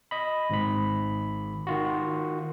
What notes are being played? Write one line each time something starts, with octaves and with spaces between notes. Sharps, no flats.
D#5 B5
G#1 G#2 B5
D#3 F4 F#4